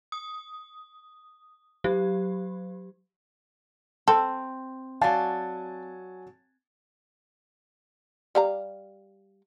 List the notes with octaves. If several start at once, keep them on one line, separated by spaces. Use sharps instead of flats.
D#6
F#3 G4
C4 A4
F#3 D5 F5 G#5 A5 A6
G3 F5 A#5